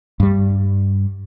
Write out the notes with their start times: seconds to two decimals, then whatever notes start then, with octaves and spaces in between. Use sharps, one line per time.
0.20 G2 G3